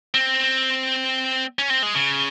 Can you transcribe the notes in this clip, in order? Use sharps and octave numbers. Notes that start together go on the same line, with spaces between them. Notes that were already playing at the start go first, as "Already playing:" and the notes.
C4
C#4
C4
G#3
C#3